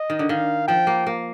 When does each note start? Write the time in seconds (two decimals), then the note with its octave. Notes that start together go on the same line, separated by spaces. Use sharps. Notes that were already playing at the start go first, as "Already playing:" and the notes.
Already playing: D#5
0.10 D#3
0.19 D3
0.29 D#3 F5
0.68 F3 G5
0.87 A#3
1.07 A#3